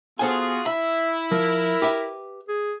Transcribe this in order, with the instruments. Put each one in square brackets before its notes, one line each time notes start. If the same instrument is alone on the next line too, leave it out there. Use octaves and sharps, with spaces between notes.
[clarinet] B3 [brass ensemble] F4 F#4 G#4 [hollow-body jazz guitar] A4 C5 G#5
[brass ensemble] E4 [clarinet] E5 [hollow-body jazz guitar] B5
[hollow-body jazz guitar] F3 [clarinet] A#4
[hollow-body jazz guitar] G4 B4 E5
[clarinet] G#4